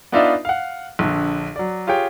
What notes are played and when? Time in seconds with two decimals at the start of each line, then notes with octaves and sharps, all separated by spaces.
0.12 B3 D4 D#4 F4 D5 E5
0.45 F5 F#5
0.99 A#1 D3
1.56 F#3 D5
1.87 F4 G4 G#4 C#5 G5